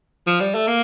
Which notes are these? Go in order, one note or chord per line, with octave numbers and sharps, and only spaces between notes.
F3
G3
A3
A#3